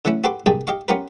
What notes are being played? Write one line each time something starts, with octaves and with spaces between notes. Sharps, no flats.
D3 E3 A3 C#4 E4
F#4 G4 A4 B4 C6 D6
C2 G2 A#3 G#4 G5 A5
G4 D#5 F5 C#6
B3 C#4 F4 G4 A#4 B4